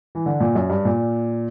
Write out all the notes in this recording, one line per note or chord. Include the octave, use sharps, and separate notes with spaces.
E3
D3
A#2
F#2
G2
A#2